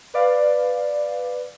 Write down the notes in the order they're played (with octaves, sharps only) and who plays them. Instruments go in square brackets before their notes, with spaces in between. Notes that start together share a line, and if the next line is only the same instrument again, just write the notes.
[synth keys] B4 D5 F5